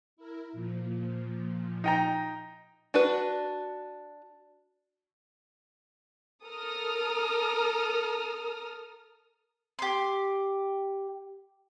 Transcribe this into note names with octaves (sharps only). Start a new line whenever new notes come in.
E4 A#4
A#2 F3
D#4 G5 A#5
D4 F#4 B4
A4 A#4 D#6 F6
G4 C6